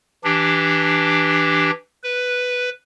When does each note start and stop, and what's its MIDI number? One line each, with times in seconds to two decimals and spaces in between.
0.24 1.71 52
0.24 1.71 62
0.24 1.71 67
2.04 2.70 71